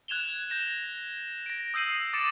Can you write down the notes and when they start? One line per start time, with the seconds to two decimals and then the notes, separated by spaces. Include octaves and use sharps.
0.08 F#6 G#6 E7 F7 G7
0.50 G6 A#6 E7
1.46 A#6 D7
1.74 D#6 E6 G6 C7 D#7 F#7
2.13 D6 A6 C#7 D7 E7